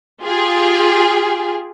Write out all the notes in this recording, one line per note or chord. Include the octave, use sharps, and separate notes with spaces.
F4 G4 G#4